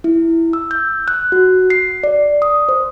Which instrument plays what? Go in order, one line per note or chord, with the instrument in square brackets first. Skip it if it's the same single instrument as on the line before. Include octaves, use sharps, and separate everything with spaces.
[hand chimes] E4
E6
G6
F#6
F#4
C7
D5
D#6
C5